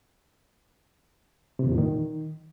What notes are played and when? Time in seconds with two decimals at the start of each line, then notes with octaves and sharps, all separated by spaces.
1.59 C3
1.65 E2
1.72 A#2
1.78 D#3